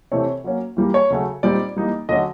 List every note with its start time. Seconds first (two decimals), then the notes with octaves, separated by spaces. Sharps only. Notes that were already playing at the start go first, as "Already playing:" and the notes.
0.11 C3 E3 A3 C4 C#5
0.44 F#3 A#3 C#4
0.77 E3 G3 A#3
0.94 C#5
1.10 C#3 F#3 A3
1.43 A#2 G3 C4 D#4 D5
1.76 E3 G3 A#3 D#4
2.09 D3 F#3 A3 C#4 D#5